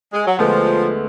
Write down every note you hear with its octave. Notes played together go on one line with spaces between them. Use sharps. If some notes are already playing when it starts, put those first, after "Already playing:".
G#3
F#3
D2 D3 F3 G#3 B3